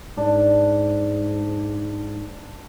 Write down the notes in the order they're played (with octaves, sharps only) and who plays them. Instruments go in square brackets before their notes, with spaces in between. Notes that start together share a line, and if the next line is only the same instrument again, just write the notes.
[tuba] G#2 [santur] D4